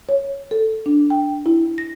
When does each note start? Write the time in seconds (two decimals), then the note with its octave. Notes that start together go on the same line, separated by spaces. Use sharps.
0.09 C#5
0.51 A4
0.86 D4
1.10 G5
1.46 E4
1.78 A#6